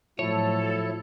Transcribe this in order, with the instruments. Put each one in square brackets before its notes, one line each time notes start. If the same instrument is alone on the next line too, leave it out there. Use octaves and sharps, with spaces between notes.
[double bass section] A2 F#3 [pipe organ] F3 E4 [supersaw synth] A4 [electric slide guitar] C#5